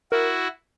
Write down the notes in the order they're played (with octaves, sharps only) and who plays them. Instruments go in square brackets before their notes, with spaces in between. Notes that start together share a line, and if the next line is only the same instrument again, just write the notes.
[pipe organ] E4 F#4 [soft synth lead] A#4